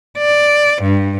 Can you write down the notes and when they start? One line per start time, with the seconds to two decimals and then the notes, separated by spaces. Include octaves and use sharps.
0.19 D5
0.82 G2